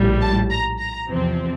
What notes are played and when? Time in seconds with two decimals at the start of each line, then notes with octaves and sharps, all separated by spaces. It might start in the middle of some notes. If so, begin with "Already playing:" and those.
Already playing: A#1 A2 G3
0.22 A5
0.50 A#5
0.79 A#5
1.07 E2 C3 F3 C4